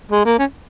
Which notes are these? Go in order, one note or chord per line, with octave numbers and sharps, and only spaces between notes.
G#3
A#3
C#4